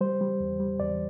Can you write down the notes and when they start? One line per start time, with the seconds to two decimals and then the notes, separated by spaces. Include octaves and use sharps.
0.01 G3 C5
0.21 G3
0.40 E2
0.60 G3
0.80 E2 D5